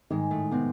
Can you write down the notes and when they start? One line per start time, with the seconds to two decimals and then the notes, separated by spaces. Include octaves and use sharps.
0.10 G#2 D#3 G#3
0.30 A2 A3
0.51 C3 B3 C4